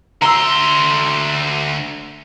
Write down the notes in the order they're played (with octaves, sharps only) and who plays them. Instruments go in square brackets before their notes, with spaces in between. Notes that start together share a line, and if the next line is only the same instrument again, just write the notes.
[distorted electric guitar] D2 C6 [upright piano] A#5 E6